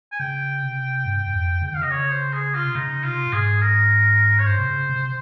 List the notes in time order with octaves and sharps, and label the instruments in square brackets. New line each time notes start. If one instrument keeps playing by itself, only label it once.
[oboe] G#5
[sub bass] C#3 [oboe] G5
[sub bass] C3
G2
G2
F2
C#3
[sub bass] D#3 [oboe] G5
[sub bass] C#3 [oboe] F5
[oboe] D#5
C#5
C5
G#4
F4
[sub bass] C3
[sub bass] C#3 [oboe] D#4
[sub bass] C3 [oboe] F4
[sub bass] A#2
[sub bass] G#2 [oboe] G#4
[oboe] A#4
C#5
[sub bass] G2 [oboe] C5
[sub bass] C3
C#3
C3